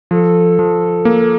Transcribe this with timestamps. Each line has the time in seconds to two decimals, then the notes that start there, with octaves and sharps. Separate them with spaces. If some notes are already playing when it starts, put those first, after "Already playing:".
0.11 F3 A4
0.59 F3
1.05 A#3